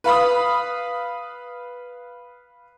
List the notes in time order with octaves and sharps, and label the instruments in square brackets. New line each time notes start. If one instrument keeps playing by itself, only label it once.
[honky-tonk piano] B4 F5 B5 D#6